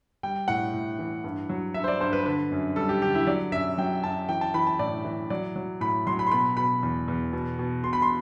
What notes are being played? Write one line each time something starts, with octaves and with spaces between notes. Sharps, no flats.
G3 G5
A2 F#5
A2
E3
G2
F#3
G2 E5
C5
D5
G2 C5
B4
D3 B4
F#2
G3 A4
G4
D3 G4
E4
F#3 D5
F#2 E5
F#3 G5
F#2 A5
E3 G5
A5
E3 B5
A5
A2 D5
E3
F#3 D5
F#3
A2 B5
F#3 C6
B5
C6
B2 B5
B2 B5
E2
E2
B2
B2
B2 C6
B5
C6